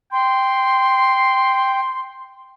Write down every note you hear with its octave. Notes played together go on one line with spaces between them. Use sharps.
G5 C6